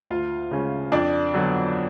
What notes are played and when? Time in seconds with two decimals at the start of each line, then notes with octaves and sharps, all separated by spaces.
0.10 D2 F4 F5
0.51 C#3 G#3 C#4
0.92 F2 D4 D5
1.34 D3 F#3 B3